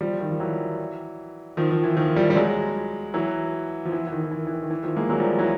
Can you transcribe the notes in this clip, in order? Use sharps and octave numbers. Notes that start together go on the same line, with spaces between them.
F3 G3
D#3 F3
F3
E3 F#3
D#3 F3
D#3 F3
E3
D#3 F3
F3 G3
G3
F#3 G#3
E3 F#3
F3
E3
E3
D#3
D#3
E3
E3
D#3
D#3
E3
D#3 F3
G#3 A#3
F#3 G#3
F3 G3
E3 F#3